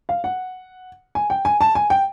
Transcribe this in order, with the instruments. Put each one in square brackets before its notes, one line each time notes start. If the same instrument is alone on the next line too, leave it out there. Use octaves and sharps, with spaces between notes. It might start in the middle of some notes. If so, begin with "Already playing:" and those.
[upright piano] F5
F#5
G#5
G5
G#5
A5
G#5
G5